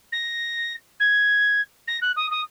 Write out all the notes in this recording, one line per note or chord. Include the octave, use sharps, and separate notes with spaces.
A#6
G#6
A#6
F#6
D#6
D#6